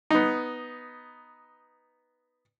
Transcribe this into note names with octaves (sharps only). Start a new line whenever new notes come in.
B3 D#4